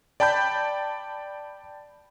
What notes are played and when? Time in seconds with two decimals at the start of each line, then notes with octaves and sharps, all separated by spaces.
0.20 D5 G5 A5 B5 G6